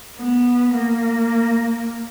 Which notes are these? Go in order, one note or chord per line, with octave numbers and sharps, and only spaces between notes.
B3
A#3